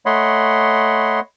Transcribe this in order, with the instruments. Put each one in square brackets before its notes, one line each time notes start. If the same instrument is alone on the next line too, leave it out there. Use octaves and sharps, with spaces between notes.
[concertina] A3 C#5 D#5 F#5 B5 C6